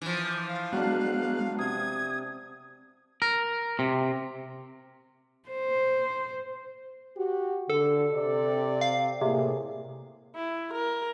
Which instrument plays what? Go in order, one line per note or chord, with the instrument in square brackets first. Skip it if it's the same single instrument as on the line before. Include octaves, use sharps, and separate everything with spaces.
[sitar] E3 F3
[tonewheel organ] D6 [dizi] G6
[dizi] F5 [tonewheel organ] A6
[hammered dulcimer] F#3 D4 [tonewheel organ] G#3 B3 F#6
[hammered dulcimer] C3 [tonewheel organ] D#6 [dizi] G#6
[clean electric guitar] A#4
C3
[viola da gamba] C5
[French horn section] F#4 G4
[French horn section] D3 [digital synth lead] A4
[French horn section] C3 G4 D5
[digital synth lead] F5
[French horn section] A2 A#3 G#4 [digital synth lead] C3
[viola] E4
A#4